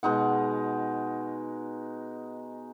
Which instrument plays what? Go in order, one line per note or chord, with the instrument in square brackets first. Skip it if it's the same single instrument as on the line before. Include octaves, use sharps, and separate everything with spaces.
[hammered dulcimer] B2 G#3 D#4 F#5